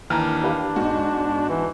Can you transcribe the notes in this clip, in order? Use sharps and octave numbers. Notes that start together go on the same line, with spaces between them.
D#2 E3 D4 A#5 F6
G4 B4 F5
G#2 B2 F#4
E3